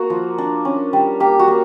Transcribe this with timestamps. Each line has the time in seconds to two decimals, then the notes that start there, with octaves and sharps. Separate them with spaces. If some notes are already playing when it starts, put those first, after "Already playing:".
Already playing: A#3 F#4
0.10 F3
0.38 D4
0.65 C#4
0.93 G3
1.20 A#3 G4
1.39 F#4
1.48 A#3